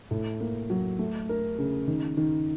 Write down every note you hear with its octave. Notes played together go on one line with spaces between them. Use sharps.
A2
A#3
F#3
A3
A#4
C#3
D#3
D#3